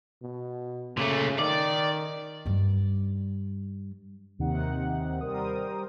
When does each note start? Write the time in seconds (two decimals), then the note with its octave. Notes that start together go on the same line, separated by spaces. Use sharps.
0.22 B2
0.97 A#2 C#3 A3
1.39 D#3 D5
2.46 G2 G3
4.39 D#2 C3 D#3 D#4 F#5
5.21 G3 A#4 C5 D#6